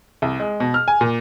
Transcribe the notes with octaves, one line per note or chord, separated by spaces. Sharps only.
C2
G#3
B2
F6
G#5
A#2